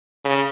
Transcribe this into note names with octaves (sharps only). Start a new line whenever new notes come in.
C#3